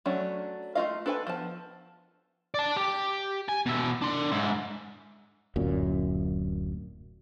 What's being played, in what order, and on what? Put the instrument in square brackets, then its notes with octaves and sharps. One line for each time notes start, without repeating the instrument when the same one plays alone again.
[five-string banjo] F#3 A3 C#4 D4
A3 C#4 F4 D#5 F5
D4 A4 B4 C#5 G#5
F3 B3 A5
[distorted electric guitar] D5 A5
G4
G#5
B2 E5
D4 C6
G#2 E4
[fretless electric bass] D1 F#2 A#2